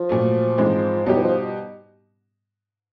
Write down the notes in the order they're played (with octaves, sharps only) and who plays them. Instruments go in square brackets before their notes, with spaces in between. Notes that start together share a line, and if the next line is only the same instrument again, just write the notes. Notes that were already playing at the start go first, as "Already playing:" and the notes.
Already playing: [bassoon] F3
[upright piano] A#2 F#3 A3
G#2 E3 G#3 C4
[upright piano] B2 G3 B3 D#4 G4 [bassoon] F#3
[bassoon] E3
F3